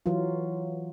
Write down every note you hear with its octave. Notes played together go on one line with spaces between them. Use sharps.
E3 F#3 F4